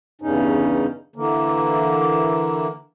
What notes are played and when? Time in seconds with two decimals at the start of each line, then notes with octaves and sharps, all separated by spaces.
0.22 E2 G2 C#3 C#4 D#4
1.16 D3 E3 A#3